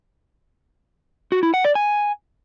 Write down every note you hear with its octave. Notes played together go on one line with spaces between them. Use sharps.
F#4
E4
F#5
D5
G#5